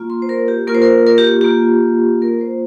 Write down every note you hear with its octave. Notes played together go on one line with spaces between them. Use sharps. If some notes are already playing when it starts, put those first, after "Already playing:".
Already playing: A#3 F4
C6
C5
A#4
G4
A#3 F4 A#4
C5
A#4
A#4
G4
A#3 F4 G4
A#3 F4 A#4
C5